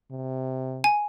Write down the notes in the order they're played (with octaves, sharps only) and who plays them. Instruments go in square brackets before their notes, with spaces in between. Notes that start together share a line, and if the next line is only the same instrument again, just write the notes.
[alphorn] C3
[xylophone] G#5